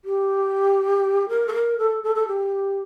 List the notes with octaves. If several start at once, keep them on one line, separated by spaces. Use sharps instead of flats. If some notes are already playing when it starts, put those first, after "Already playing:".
G4
A#4
A4
A#4
A4
A4
A4
G4